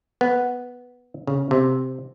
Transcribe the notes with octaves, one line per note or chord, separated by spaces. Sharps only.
B3
C#3
C3